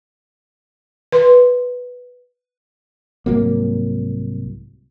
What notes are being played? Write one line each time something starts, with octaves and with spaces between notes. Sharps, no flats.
B4 C6
C2 G#2 F#3 A#3